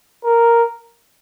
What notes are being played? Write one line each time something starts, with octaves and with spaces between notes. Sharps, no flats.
A#4